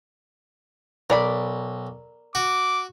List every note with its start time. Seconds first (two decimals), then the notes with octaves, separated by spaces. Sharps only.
1.10 B1 A#4 D5 B5
2.35 F#4 D6